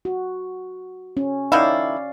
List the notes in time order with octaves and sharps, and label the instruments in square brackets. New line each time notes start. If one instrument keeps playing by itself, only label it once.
[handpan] F#4
C#4
[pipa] D#3 F#3 E4 [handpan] D5 F5